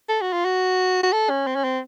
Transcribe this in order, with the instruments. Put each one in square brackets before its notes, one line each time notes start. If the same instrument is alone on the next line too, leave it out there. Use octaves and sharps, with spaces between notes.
[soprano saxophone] A4
F#4
F4
F#4
F#4
A4
C#4
C4
C#4
C4